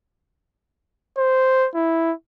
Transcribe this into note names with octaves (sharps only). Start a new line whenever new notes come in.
C5
E4